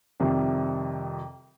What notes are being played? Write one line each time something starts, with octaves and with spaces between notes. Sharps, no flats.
F2 C3 D#3 G3